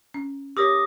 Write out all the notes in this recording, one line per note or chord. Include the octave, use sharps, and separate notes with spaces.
C#4
G4 A#4 C#5 D6 D#6 A#6